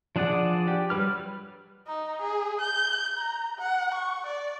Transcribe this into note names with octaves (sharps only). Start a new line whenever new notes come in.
F3 D4 G#4 D5 F#5
G4
F#3 G3 B4 F6
D#4
G#4
G6
A#5
F#5
C#6
D5